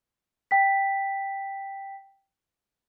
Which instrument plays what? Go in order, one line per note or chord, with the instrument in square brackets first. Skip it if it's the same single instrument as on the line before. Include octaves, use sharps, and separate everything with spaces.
[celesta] G5 B6